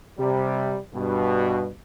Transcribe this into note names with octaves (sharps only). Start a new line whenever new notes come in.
C3 G3
G2 B2